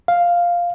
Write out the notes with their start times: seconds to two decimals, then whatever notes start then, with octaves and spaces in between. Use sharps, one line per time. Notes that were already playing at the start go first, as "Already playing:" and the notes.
0.08 F5